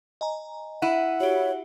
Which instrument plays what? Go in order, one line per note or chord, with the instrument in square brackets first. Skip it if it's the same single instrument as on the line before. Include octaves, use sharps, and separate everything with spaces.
[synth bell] D#5 G#5 A#5
[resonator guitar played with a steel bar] E4 [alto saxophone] F#5 [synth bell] D#7
[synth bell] F#4 G4 [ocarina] C#5